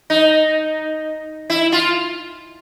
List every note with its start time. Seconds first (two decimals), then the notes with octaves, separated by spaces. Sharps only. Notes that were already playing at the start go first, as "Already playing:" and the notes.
0.10 D#4
1.50 E4
1.72 F4